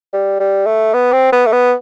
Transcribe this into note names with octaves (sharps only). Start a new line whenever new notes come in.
G3
G3
A3
B3
C4
B3
A3
B3